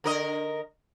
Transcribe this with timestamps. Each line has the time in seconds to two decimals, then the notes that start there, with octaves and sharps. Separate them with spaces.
0.04 D3 A#4 D#5